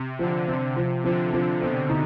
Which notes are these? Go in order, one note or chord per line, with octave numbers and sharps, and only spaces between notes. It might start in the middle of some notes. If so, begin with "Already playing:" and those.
Already playing: C3
D3 F3
C3 C4
C3 F3
D3 F3
C3 F3
B2 C4
D#4